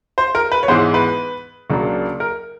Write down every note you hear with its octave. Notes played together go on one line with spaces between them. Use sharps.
C5
A#4
B4
C#5
G#2 E3 G#3 B3 C5
B4
C#2 C#3 F#3 A#3 D4
A#4